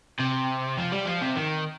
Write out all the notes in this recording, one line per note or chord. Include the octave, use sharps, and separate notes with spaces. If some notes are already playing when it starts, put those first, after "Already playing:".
C3
F3
G3
F3
C3
D#3